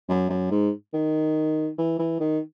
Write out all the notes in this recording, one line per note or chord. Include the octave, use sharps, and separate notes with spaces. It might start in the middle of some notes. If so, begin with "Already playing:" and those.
F#2
F#2
G#2
D#3
E3
E3
D#3